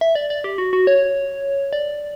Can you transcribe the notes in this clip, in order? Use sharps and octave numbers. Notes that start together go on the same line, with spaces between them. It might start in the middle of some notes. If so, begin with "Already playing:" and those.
E5
D5
D5
G4
F#4
F#4
C#5
D5